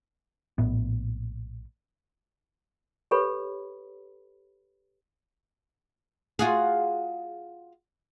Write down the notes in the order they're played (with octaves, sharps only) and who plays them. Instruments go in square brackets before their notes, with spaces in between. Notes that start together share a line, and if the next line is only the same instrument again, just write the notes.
[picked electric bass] A#1 A2 B3
[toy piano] G4 A4 B4 C#5 B5
[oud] F4 F#4 G#4